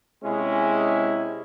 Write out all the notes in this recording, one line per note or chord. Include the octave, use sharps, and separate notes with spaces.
C3 G#3 C#4 E4